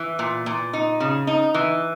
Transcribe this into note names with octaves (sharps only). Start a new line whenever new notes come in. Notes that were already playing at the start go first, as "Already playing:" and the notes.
Already playing: E3
A#2
A#2
D#4
C#3
D#4
E3